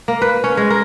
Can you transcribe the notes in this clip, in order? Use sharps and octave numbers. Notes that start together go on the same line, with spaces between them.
A#3
B4
C#4
G#3
A#4